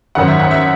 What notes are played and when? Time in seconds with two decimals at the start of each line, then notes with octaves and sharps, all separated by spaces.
0.15 G#1 F#2 D#3 F#5
0.28 E5
0.40 F#5
0.51 E5